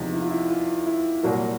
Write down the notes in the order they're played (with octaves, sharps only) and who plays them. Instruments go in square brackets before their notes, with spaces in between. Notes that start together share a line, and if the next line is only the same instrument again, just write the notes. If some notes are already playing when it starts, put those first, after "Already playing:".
Already playing: [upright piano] E2 C3 F3 G#3 [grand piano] D#4
[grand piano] E4
F4
E4
F4
E4
[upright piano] C2 A#2 F#3 A#3 [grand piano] F#4